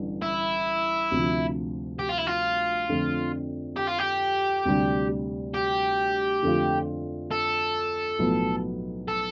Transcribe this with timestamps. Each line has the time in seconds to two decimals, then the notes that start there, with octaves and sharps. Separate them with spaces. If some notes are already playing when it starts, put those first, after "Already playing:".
Already playing: A1 G2 D3
0.22 E4
1.11 D2 C3 F3
1.99 G4
2.09 F4
2.18 E4
2.27 F4
2.89 F2 D3 A3 C4
3.76 G4
3.87 F4
3.98 G4
4.65 D2 C3 G3 D4
5.54 G4
6.42 F2 D3 A3 C4 F4
7.31 A4
8.19 B1 A2 F3 B3
9.08 A4